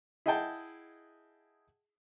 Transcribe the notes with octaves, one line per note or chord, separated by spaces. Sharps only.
E4 G#4 D#5 F#5 G5 A5